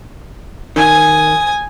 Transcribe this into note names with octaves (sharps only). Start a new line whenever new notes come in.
D#3 G#5 D#6